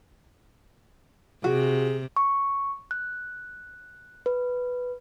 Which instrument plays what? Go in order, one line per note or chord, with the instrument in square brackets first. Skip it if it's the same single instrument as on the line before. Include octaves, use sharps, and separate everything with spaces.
[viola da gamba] C3 [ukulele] F#4 [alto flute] G#4
[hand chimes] C#6
F#6
B4